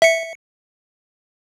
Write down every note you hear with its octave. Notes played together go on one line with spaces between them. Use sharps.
E5 C#7